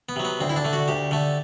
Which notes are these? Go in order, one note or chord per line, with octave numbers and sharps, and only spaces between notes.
B3
C3 F#3
B3
D2 C4
E4
D4
D3 A3
F#4
D2 G4
D3 A3